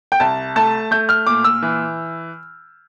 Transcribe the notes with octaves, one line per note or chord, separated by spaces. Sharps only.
G5
C2 A5
A3 A5
A3 G6
F6
A#2 D6
E6
E3